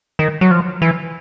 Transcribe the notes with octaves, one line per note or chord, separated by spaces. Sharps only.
D#3
F#3
F3
E3